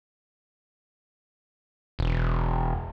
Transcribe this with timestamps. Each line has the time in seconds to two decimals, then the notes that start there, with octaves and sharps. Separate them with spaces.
1.99 E1